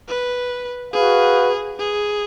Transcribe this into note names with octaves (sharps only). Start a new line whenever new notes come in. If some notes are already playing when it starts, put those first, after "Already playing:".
B4
F#4 G#4 B4 F5
G#4